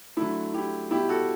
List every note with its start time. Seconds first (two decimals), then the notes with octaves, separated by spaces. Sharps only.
0.17 D3 F#3 A3 E4
0.54 E4 G4
0.91 B2 G3 E4 G4
1.09 F#4 A4